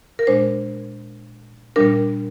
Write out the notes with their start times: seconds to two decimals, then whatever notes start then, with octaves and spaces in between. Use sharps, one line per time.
0.19 A#4
0.27 A#2 G#3 D4 C5
1.76 A#2 G3 D4 A#4